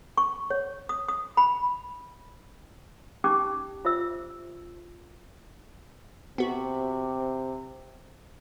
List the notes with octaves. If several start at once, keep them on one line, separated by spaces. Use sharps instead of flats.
C#6
C#5
D#6
D#6
B5
C#4 D#4 G4 D6
F4 C5 E5 E6
C3 B3 F#4